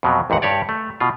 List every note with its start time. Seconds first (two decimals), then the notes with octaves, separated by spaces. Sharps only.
0.03 F2 B2 F#3
0.30 A1 D#2 G#2 F#5
0.42 G2 G4 C#5 D5
0.69 A3
1.00 B2 F4